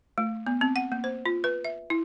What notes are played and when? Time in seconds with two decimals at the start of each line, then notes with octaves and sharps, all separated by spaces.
0.18 A3
0.46 B3
0.61 C4
0.76 F#5
0.92 A#3
1.04 C5
1.26 F4
1.44 B4
1.65 E5
1.90 E4